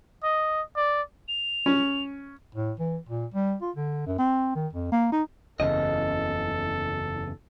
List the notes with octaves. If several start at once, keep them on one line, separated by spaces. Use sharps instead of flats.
D#5
D5
F7
C#4
A2
E3
A#2
G3
F4
D3
F#2
C4
D#3
F2
A#3
D#4
F#1 E2 C#3 A4 D#5